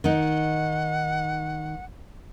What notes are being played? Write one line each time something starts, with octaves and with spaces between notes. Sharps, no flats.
D#3 D#4 F#5